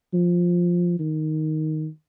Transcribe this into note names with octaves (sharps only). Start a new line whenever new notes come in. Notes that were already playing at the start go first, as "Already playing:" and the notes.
F3
D#3